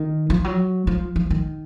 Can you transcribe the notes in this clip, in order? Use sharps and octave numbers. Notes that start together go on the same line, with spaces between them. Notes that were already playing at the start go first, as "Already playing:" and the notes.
Already playing: D#3
F3
F#3
F3
F3
D#3